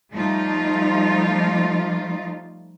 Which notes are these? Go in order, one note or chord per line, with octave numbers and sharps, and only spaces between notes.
F3 G3 A3 D#4 F4